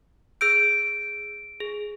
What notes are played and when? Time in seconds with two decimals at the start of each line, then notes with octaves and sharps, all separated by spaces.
0.41 G#4 E6 G6 D7
1.60 G#4